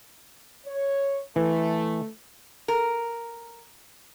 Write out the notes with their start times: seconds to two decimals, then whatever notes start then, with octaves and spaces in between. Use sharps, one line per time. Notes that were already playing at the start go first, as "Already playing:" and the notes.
0.66 C#5
1.36 E3 A3
2.68 A#4